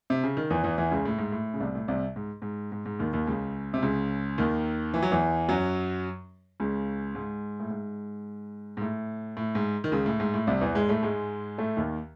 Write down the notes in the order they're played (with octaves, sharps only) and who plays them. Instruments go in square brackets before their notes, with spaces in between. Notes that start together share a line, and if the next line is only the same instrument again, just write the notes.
[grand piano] C3
C#3
D#3
E2 E3
E2 E3
E2 E3
C#2 C#3
A2
G#2
A2
C#3
C2 C3
A2
C2 C3
G#2
G#2
G#2
G#2
D#2 D#3
D#2 D#3
C#2 C#3
C3
C#2 C#3
D#2 D#3
E3
F#3
E2 E3
F#2 F#3
C#2 C#3
G#2
A2
G#2
G#2
A2
A2
G#2
D#3
C#2 C#3
A2
G#2
A2
C2 C3
E2 E3
G#2 G#3
A2 A3
G#2 G#3
A2 A3
D#2 D#3